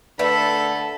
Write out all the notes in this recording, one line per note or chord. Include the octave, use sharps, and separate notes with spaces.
D3 A3 A4 B4 D5 B5